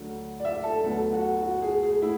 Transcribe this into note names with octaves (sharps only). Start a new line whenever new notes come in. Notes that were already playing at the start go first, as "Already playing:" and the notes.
Already playing: D2 D3 F#3
D5
E5
A4
D2 D3 F#3 B3 A4
F#4
F#4
G#4
G#4
A2 E4